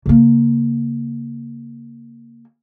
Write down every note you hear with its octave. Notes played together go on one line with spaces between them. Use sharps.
C#3 A#3